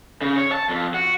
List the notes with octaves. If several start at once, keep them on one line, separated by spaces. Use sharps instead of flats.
C#3
C#5
A5
F2
F#4